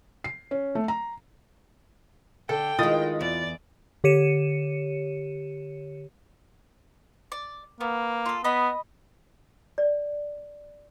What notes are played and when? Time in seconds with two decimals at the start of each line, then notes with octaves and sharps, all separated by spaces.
0.24 C7
0.51 C#4
0.75 A3
0.88 A#5
2.49 D3 A4 G5
2.79 D#3 G#3 E4 F4 D#6 A6
3.21 E2 D5
4.04 D3 G4 C#5 C#7 D#7 E7
7.32 D5
7.81 A#3 B3
8.26 F4 A4
8.44 B3 D#5 B5
9.78 D5